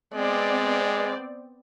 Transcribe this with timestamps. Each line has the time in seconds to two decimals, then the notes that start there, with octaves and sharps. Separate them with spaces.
0.14 G#3 B3 C4 D5